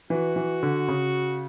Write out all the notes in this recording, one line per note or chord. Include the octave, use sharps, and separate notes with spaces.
E3 F#4
E3
D3
C#3